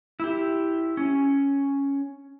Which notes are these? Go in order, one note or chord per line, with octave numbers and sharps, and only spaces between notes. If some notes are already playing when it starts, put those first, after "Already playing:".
E4 G4
C#4